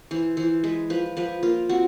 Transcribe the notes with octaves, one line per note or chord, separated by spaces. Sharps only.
E3 C5
E3 C5
G#3 B4
F3 B4
F3 B4
A#3 F4
C4 F#4